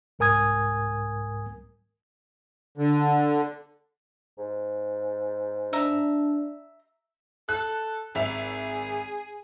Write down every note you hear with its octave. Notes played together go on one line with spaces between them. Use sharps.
C2 G#2 A#4 G#5 D#6 G#6
D3
G#2
D4 E5 A#5
A4 F#6
G#1 G#4 E5 F7